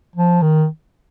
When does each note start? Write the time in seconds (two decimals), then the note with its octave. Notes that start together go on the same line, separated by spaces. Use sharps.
0.16 F3
0.42 D#3